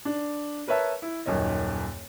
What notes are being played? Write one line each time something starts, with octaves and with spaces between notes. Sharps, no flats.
D4
A#4 B4 C#5 E5 A5
E4
D#1 F#2 D#3 C#5 D#5